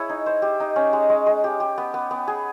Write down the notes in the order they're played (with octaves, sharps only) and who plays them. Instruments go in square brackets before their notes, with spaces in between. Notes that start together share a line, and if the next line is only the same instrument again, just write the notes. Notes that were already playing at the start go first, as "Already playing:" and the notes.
Already playing: [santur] E4 G#4 C#5
D#4
C5
G4
D#4
C#4
G#3
G#3
G#3
G4
G4
B3
B3
B3
G#4